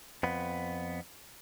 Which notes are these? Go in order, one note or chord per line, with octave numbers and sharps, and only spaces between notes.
F2 B3